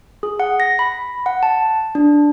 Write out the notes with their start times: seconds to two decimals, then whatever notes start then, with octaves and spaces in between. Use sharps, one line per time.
0.23 G#4
0.40 F#5
0.60 A#6
0.79 B5
1.26 F#5
1.43 A5
1.95 D4